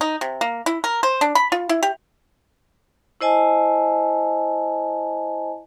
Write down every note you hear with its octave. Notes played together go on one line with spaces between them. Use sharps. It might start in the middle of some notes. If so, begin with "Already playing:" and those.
D#4
C3
A#3
E4
A#4
C5
D4
B5
F4
E4
G4
E4 C5 D#5 G#5 A5